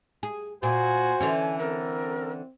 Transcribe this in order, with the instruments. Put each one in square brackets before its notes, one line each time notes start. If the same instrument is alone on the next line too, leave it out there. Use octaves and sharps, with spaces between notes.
[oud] G#4
[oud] A#2 [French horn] F#4 [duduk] C5 [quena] G#5
[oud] D3 E3 C#4
[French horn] C4 [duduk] A4 [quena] A#4